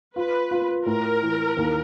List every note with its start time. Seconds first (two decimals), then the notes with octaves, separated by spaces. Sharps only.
0.16 F4 B4
0.51 F4
0.86 A2 A#4
1.23 E3
1.57 D#2